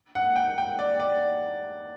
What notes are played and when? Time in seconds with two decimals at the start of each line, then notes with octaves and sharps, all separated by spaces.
0.15 F#5
0.36 G5
0.58 G5
0.79 D5
1.00 D5